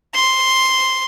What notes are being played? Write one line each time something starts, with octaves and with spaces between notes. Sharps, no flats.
C6